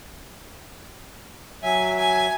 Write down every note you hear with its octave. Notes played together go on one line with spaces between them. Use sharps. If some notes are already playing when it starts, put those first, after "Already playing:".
F#3 E5 G#5
G#5